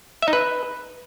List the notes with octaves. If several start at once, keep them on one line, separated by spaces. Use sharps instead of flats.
E5
D#4
B4